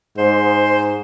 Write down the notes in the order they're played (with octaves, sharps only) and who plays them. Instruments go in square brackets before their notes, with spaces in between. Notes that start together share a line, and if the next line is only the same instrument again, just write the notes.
[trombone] G#2 [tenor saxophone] C5